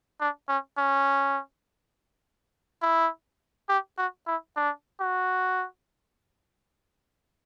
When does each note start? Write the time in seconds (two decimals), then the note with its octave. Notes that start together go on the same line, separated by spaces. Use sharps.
0.21 D4
0.49 C#4
0.78 C#4
2.82 E4
3.69 G4
3.98 F#4
4.27 E4
4.57 D4
5.00 F#4